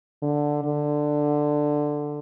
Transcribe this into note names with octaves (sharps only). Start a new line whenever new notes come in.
D3
D3